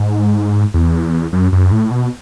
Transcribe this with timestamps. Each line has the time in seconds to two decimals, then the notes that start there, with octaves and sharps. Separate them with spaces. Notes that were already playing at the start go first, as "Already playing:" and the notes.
Already playing: G#2
0.74 E2
1.33 F#2
1.52 F#2
1.72 A2
1.91 B2